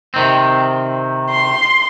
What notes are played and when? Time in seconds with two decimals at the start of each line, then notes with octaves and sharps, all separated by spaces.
0.14 C3 D#3 C4
1.30 C6